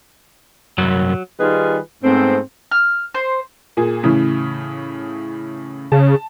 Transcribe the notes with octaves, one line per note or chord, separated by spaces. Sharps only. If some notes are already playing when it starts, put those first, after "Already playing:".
C2 F#2 F#3
D#3 G3 D#4 F4 G#4 B4
G#2 A3 B3 C4
F6
C5
A#2 G#4
A2 C#3 E3
C#3 A5